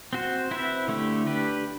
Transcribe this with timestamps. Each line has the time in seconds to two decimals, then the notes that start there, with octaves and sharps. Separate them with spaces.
0.13 C4 F#4 C5
0.51 C4 E4 B4 E5
0.88 D3 A3 E4 G4
1.26 D4 G4 B4